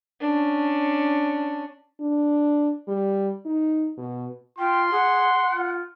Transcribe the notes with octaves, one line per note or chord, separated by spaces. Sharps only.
C#4 D4
D4
G3
D#4
B2
F4 G5 C6
G#4 F#5
F4